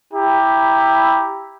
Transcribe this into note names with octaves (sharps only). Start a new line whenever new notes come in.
E4 G4 A#5